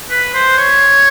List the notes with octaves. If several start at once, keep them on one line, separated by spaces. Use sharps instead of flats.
B4
C5
C#5